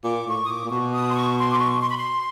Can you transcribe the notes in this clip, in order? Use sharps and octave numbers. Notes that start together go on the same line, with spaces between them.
A#2 D6
A2 C#6
D#6
A#2 D6
A#2
B2 C#6
D#6
B5
C6
C#6
C6
D6
C#6
C6
B5
C6